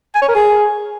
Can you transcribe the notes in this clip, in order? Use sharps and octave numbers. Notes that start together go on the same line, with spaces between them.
G#5
C#5
A#4
G#4